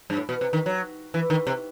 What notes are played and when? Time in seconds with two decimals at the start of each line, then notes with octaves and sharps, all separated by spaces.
0.10 G2
0.17 A2
0.29 B2
0.41 C3
0.53 D#3
0.66 F#3
1.14 E3
1.30 D#3
1.47 C3